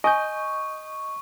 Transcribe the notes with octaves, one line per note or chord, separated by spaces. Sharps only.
D#5 G#5 C#6 D#6 G6